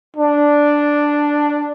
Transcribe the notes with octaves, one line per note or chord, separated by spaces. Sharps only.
D4